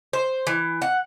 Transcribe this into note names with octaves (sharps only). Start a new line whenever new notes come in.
C5
E3
F#5